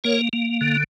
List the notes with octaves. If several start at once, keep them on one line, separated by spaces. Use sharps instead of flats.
A#3 A#4 C#5
A#3
D3